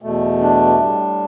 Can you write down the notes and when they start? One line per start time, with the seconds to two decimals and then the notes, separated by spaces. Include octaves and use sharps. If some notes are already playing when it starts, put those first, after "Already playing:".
0.02 E2 B2 A3
0.41 D4
0.79 A2 G3